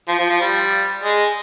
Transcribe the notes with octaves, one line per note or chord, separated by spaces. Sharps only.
F3
F3
F3
G3
G#3